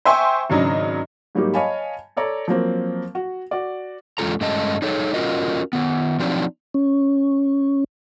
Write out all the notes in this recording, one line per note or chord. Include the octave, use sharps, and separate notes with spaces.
C5 E5 G5 G#5 C6 C#6
G#1 C#3 F#3 D4 D#5
G#2 F#3 G3 A#3 D#4 G4
C#5 D#5 F5 G#5 A5 B5
A4 C#5 D5 A#5
F3 F#3 A#3 C4
F#4
F#4 D5
E2 G#3 C#4 F4 A4 A#5
G2 G#3 A3 C#4 D#5 A5
D#4 G#4 A4 C#5
C#4 F4 F#4 A#4 D#5
D#3 B3
F3 F#3 C4 D4 D#4
C#4